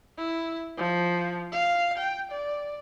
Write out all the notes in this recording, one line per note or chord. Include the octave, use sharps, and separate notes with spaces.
E4
F3
F5
G5
D5